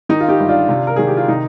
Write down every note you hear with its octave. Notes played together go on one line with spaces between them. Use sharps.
D#3 D#4
F4
D#4 G4
G1
D4 F4
C3
A#4
D#3 G#4
G4
F4
C3 D#4